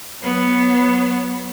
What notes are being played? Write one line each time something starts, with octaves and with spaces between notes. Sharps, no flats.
F#3 B3